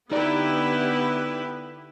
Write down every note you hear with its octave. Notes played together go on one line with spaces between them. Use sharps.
D3 B3 D#4 E4 G4 B4 D5